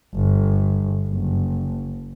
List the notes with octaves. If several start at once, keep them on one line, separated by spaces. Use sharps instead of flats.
G1
F#1